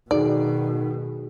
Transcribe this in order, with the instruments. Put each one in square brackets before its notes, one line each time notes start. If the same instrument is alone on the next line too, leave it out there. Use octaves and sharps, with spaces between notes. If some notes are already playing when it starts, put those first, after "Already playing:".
[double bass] B2 D#3 [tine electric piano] D#4 [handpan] F#4 G#4 A4 [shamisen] D5